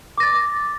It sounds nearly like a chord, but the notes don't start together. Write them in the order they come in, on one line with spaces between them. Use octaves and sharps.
D6 A#6 A6